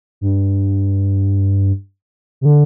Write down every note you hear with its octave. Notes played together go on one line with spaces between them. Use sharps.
G2
C3
D3